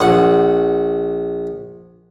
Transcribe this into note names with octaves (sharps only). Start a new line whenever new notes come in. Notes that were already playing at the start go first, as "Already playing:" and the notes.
A#1 F#5